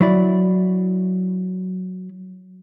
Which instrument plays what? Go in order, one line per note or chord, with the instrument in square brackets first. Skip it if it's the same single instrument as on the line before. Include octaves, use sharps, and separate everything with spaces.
[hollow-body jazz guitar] F#3 E4 D5